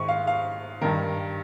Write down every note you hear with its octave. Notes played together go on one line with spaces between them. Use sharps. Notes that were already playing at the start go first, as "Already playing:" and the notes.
Already playing: G#2 D#3 C#6
F5
F5
G2 D#3 A#4